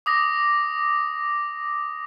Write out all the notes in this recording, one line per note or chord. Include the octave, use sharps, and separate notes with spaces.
D6 D#6 A#6